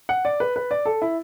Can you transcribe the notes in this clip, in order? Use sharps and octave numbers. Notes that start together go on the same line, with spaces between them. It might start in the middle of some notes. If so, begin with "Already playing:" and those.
F#5
D5
B4
B4
D5
A4
E4